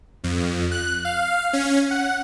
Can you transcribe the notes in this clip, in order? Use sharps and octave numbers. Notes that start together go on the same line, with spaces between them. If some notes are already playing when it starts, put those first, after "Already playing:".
F2
F#6
F5
C#4
F#5